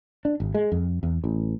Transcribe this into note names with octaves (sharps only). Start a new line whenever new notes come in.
D4
G#1
G#3
F2
E2
A1